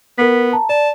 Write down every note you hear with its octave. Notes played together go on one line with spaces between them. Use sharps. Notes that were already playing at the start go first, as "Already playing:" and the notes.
B3 A#4 B6
A5 A#5
D5 A5